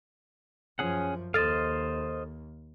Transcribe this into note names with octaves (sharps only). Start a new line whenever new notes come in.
F#2 F3 C#4 G#4 F#5
D#2 A4 C5 D#5 F5 A6